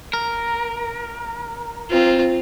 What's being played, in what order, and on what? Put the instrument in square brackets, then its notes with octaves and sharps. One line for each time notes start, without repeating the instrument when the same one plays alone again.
[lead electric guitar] A#4
[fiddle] C4 F4